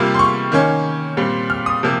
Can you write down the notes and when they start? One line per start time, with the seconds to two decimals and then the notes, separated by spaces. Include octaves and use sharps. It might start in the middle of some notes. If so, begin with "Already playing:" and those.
Already playing: C3 G3 A#3 F4
0.14 C6
0.19 C#6
0.52 D#3 A#3 C#4
1.17 A#2 G3 C4
1.50 F6
1.66 D#6
1.83 C3 F3 A#3